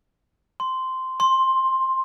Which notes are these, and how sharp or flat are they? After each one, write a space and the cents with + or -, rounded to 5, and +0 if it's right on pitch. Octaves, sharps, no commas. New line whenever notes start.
C6 -10
C6 +10